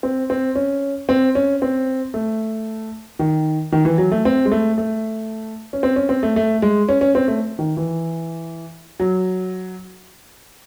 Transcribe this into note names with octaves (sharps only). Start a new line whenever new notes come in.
C4
C4
C#4
C4
C#4
C4
A3
D#3
D#3
E3
F#3
A3
C4
G#3
A3
A3
C#4
C4
C#4
C4
A3
A3
G#3
C#4
C#4
C4
A3
D#3
E3
F#3